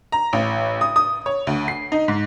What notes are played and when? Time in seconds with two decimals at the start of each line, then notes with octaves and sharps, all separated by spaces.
0.12 A#5
0.33 A1
0.81 D#6
0.96 D#6
1.26 C#5
1.47 D2
1.68 C7
1.92 D#4
2.08 G#2